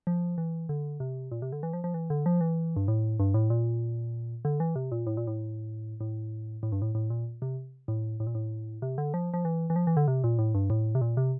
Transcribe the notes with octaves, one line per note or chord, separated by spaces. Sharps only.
F3
E3
D3
C3
A#2
C3
D3
E3
F3
F3
E3
D3
F3
E3
G2
A2
G2
A2
A#2
D3
E3
C3
A#2
A2
A#2
A2
A2
A2
G2
A2
A2
A#2
C3
A2
A2
A#2
A2
C3
D3
F3
F3
E3
E3
F3
E3
D3
C3
A#2
A2
G2
A2
C3
A#2
C3